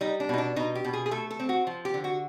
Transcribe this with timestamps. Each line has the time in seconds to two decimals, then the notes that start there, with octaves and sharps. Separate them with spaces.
0.01 G3 D#4
0.20 D4
0.29 B2 D#4
0.38 D4
0.56 B2 D#4
0.75 G4
0.84 B2
0.93 G#4
1.06 G#4
1.11 A3 A4
1.31 A4
1.40 C4
1.49 F#4
1.67 F3
1.85 G4
1.94 D3
2.04 F#4